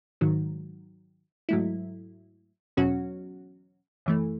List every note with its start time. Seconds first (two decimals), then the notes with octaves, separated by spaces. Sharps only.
0.21 G#2 D#3 F#3
1.49 G#2 F#3 A3 E4
2.77 E2 B2 F#3 C#4 F#4
4.06 F#2 E3 A3